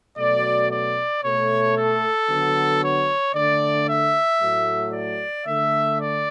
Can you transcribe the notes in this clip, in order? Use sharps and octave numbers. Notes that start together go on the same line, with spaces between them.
B2 F#3 A3 D5
D5
B2 A3 C#5
A4
D3 F#3 B3
C#5
D3 A3 D5
E5
A2 F#3 A3
D5
D3 A3 E5
D5